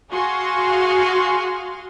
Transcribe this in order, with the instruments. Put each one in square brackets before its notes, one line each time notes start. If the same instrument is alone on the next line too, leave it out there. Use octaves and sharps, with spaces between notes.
[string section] F#4 G#4 F5 C6